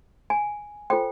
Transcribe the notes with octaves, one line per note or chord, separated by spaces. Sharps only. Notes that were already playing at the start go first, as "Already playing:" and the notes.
G#5
F4 A4 C5 G5